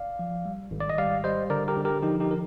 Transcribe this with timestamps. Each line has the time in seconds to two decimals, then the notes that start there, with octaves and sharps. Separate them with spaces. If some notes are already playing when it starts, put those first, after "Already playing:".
Already playing: D5 F5
0.19 F3
0.46 G3
0.71 G#1
0.80 D5
0.90 D#5
0.98 G3 D5 F5
1.24 G3 C5 D#5
1.50 D3 A#4 D5
1.68 G4 A#4
1.77 D3
1.85 G4 A#4
2.02 F3 D#4 G4
2.20 D#4 G4
2.31 A#4